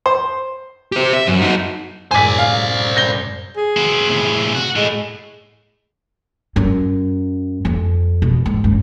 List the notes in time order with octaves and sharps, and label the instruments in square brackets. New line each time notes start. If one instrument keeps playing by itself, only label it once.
[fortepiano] C5
[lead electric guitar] G4 C5
E5
F#2
D#4 F#4
[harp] F#2 A2 G#3 [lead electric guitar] C5 D5 [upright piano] G#5 B6
[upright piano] F5
G6 A#6 G7
[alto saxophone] G#4
[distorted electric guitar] C4 F#4
A2 C3
F#4
[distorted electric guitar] A2 [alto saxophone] G#3
[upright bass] F#2
F2
B2
G#2
F#2